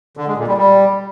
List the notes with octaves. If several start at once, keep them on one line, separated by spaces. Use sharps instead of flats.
D3
G#3
A#2
G3
G3